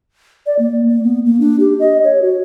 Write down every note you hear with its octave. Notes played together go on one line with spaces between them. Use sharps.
D5
A#3
A#3
B3
A#3
D4
G4
D#5
C#5
F#4